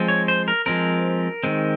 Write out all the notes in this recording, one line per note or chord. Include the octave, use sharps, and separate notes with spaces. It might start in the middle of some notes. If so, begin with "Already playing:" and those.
Already playing: F3 G#3 C4
C#5
C5
A#4
F3 G#3 C4 A#4
D#3 G#3 C4